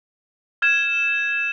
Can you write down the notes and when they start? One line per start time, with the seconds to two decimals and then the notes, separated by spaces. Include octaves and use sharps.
0.62 F6 G#6 E7